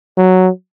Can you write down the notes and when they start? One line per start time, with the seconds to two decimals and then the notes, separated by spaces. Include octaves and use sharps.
0.17 F#3